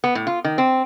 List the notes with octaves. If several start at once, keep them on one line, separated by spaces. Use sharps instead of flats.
B3
A2
F4
D#3
C4